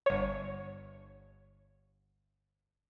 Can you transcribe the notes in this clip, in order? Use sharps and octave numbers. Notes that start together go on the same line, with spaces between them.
G1 C#5